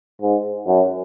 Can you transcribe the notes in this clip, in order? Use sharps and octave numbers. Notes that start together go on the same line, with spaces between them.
G#2
F#2